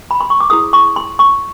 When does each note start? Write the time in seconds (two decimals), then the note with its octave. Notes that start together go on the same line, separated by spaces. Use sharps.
0.11 B5
0.21 C6
0.30 C#6
0.40 D6
0.50 E4 G#4 C5 D#6
0.73 C#6
0.96 C6
1.19 C#6